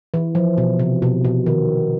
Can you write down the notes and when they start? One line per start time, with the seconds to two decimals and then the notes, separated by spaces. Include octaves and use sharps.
0.14 E3
0.35 F3
0.58 B2
0.79 C3
1.02 B2
1.25 B2
1.46 D#3